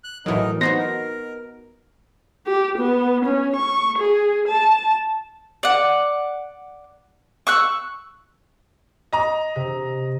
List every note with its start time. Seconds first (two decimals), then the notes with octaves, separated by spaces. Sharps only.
0.04 F#6
0.26 A2 E3 F#3 D#4 A#4
0.61 B3 D#4 F#4 C5 A#6
0.79 A#4
2.47 G4
2.79 B3
3.26 C#4
3.56 C#6
3.99 G#4
4.48 A5
5.63 D5 F#5
7.47 C#6 E6 F#6
9.13 D#5 A#5
9.56 C3